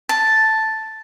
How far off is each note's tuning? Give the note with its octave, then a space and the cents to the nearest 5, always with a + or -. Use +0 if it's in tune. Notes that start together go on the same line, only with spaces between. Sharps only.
A5 +0